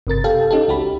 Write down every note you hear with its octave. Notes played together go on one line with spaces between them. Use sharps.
G1 C3 A#4 A6
G4 A4 F5 G5
C#4 D#4 G4 A4
C#2 F#4 G4 B5